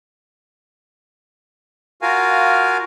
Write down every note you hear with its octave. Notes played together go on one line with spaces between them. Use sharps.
F4 F#4 A#4 F5 G#5